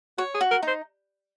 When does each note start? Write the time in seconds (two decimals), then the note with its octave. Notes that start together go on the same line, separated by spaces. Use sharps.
0.18 F#4 C#5
0.35 G#4
0.41 F#4
0.51 A#4
0.63 D#4
0.68 C5